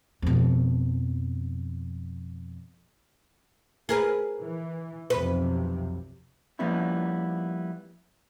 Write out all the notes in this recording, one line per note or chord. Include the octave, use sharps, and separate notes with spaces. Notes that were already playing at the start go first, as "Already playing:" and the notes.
F2 B2
G#4 A#4 B4
E3
B1 F2 C3 B4
F3 G3 A#3 B3 C#4 E4